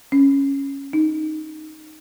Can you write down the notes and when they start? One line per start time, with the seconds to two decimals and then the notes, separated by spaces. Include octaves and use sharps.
0.12 C#4
0.93 D#4